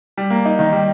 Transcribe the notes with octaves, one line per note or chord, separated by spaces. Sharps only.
G3
A#3
D#4
D#3
G3